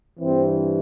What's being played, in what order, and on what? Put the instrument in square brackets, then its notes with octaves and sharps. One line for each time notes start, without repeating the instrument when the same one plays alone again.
[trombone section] G2 E3 C4